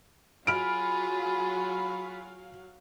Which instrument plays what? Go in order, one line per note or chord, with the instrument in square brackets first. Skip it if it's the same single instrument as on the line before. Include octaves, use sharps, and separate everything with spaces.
[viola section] F#3 F#4 F5 [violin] F4 G#4 [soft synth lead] B5 [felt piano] F6 D7